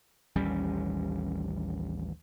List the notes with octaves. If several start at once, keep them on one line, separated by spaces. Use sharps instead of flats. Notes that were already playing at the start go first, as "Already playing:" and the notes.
A1 D#2 G3 C#4